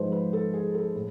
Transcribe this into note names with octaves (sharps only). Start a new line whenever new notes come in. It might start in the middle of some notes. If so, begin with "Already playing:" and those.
Already playing: G#2 F3 G#3 B4 C5
B4
A4
G#4
A4
A2